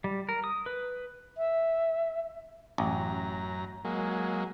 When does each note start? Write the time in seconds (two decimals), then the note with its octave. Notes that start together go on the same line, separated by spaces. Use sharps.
0.04 G3
0.29 A#4
0.44 D#6
0.66 B4
1.38 E5
2.78 A1 F#2 A#5
3.85 F#3 G#3 A#3